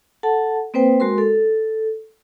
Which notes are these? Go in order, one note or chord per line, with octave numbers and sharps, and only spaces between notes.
A4 F#5 A5
A#3 C4 B4 C5 G5
G#3 F#4 A#4 C6
A4